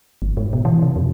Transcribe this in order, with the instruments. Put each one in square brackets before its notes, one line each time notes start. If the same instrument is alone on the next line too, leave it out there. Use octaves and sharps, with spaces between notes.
[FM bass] G1
G#2
B2
E3
C3
F2